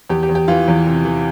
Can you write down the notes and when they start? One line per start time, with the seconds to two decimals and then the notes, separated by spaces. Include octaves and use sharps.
0.10 E2 G4
0.23 G4
0.29 E2
0.35 G4
0.48 E3 F4
0.68 E2
0.87 C3
1.05 E3